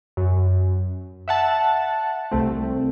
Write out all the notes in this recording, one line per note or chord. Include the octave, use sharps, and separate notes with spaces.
F#2
E5 F#5 A5
C2 A3 C4